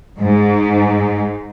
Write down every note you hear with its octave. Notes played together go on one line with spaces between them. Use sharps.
G#2